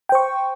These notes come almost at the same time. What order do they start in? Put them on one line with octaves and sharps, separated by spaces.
G5 C5 C#6